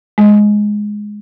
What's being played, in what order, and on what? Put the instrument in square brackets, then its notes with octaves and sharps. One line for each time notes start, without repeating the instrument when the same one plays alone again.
[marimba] G#3